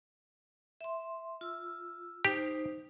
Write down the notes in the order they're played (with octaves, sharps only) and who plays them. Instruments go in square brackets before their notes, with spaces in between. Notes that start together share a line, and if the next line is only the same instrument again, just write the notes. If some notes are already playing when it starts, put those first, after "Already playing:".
[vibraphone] E5 C6
F4 E6
[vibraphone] D#4 C5 [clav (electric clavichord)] G4